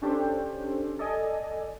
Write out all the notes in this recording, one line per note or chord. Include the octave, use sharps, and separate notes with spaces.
C#4 D4 G4 A4 C5
A4 D5 D#5 G#5